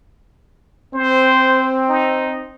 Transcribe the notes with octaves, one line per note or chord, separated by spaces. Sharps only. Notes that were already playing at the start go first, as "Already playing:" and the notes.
C4 C5
D#4